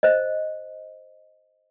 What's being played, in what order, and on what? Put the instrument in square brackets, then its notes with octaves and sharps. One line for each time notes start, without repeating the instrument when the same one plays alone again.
[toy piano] C5 D#5